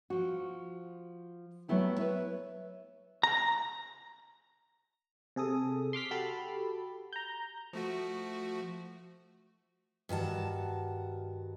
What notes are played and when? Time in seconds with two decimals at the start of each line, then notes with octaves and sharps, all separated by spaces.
0.10 F3 F#4
1.68 F#3 A3 B3 E4 G4
1.98 B4 C#5 E5
3.23 A#5
5.36 C3 G#4 A4 D#6
5.93 C6 D6 F6 B6
6.11 F#4 G4 A4 A5 B5
7.13 A#5 G6
7.73 F3 A3 F#4
10.09 G2 D#3 F#4 A5